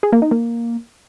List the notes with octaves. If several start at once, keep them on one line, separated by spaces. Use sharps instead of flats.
G#4
A#3
D#4
A#3